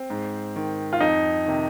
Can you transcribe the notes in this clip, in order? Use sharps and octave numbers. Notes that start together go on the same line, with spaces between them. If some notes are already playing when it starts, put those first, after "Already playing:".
Already playing: C4
G#2
D#3
F4
F2 D#4
C3 D#3